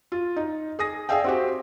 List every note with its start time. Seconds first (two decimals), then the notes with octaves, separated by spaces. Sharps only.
0.12 F4
0.36 D#4
0.79 G#4 D#6 A#6
1.09 G#4 D5 E5 F5 G5
1.24 C4 F#4 G4